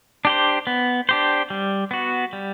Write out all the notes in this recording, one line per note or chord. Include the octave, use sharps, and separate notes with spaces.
D4 G4 C5
B3
D4 G4 C5
G3
B3 F#4
G3